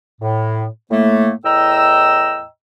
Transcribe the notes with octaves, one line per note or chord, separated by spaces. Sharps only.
A2
A2 A3 A#3
E2 A2 D#5 G5 A#5 E6